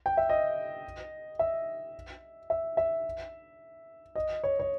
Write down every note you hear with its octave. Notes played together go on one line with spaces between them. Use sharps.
G5
E5
D#5
E5
E5
E5
D#5
C#5
C#5